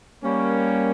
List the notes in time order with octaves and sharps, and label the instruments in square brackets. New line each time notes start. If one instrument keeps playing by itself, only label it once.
[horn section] G3 A#3 C#4